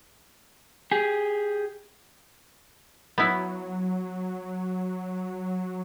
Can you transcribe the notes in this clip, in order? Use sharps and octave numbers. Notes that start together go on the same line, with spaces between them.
G4 G#4
F#3 B3 E4